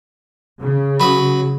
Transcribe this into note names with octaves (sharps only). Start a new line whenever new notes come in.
C#3
F#3 B4 B5 D#6